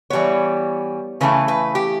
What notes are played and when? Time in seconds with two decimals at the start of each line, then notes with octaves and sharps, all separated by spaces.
0.10 E3 G3 B3 C#5
1.21 C#3 E3 A3 E4 B4
1.48 B4
1.75 G4